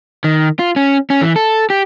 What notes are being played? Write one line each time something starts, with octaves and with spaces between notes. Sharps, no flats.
D#3
F4
C#4
C#4
E3
A4
G4